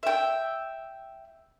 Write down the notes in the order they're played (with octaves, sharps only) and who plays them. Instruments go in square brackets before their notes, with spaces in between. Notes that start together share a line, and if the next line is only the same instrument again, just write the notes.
[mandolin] E5 G5